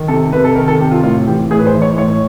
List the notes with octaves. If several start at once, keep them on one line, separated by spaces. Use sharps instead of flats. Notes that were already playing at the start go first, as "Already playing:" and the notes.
Already playing: D#3
C3 A4
C3 B4
A4
D#3 A#4
A4
C3 G4
F4
A2 F4
E3 G4
A2 G#4
B4
C5
E3
C#5
A2 C#5